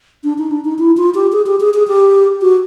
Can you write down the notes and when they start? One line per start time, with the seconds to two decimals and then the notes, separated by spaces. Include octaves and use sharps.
0.24 D4
0.38 D#4
0.51 D4
0.65 D#4
0.79 E4
0.97 F4
1.15 G4
1.32 G#4
1.46 G4
1.60 G#4
1.74 G#4
1.88 G4
2.42 F#4